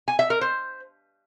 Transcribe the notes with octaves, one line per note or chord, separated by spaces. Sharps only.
G#5
E5
A#4
C5